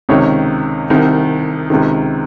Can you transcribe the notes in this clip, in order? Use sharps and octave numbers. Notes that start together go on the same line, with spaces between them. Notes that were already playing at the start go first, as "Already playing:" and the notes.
C#2 C3 D#3 C#5
C2 C3 D#3
C#2 C3 D#3